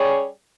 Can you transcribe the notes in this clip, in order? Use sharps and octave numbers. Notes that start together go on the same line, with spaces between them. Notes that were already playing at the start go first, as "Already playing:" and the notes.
Already playing: G3 C#4 G#4 C#5